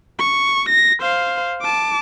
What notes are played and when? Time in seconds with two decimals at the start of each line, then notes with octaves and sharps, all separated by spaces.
0.19 C#6
0.69 A#6
1.01 C5 F5
1.61 A5 D6